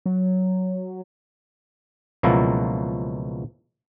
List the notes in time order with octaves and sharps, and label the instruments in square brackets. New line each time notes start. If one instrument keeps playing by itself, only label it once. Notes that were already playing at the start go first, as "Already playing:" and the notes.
[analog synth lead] F#3
[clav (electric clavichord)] C#2 B2 F3 F#3 A#3 E4